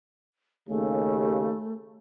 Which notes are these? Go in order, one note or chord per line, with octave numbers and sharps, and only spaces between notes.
D#2 C#3 A3